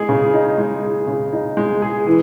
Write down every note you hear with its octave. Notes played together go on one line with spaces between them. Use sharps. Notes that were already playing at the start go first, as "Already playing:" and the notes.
Already playing: G#3 G#4
C#3
D#4
G#3
G#4
C#3
D#4
G#3
G#4
E3